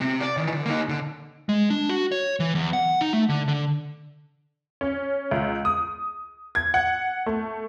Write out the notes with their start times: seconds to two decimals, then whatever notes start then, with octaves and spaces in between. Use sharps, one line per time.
0.01 C3 C4
0.20 D5
0.37 D#3 E3
0.53 D3
0.66 A#3 D#4
0.89 D3
1.49 G#3
1.70 D4
1.89 F#4
2.12 C#5
2.40 E3
2.55 E2
2.73 F#5
3.01 D#4
3.13 A3
3.29 D3
3.48 D3
4.81 C#4
5.31 C#2
5.65 D#6
6.55 G#6
6.74 F#5
7.26 A3